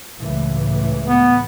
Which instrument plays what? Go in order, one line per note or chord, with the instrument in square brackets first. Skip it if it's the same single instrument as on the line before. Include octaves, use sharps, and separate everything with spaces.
[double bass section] C#2 A2 E3
[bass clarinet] B3